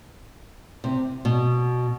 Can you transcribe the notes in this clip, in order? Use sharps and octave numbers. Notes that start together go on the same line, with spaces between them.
C3
B2